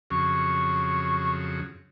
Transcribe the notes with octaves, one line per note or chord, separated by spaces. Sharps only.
F2 C#3 F#3 C#6